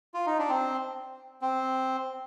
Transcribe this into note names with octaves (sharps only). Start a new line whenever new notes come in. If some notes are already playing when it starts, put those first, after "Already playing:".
F4
D#4
D4
C4
C4